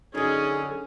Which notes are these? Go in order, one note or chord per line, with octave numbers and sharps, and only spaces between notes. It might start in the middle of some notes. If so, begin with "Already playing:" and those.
F#2 D3 C#4 D#4 G#4